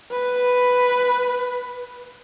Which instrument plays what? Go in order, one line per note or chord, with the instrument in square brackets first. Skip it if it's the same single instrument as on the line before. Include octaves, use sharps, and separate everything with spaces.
[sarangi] B4